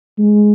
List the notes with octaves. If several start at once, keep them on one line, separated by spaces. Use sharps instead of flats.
G#3